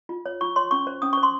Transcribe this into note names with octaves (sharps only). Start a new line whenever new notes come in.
F4
C#5
F4 C#6
C#5 C6
C#4 C#6
C5
C#4 D#6
C#6
C5
C6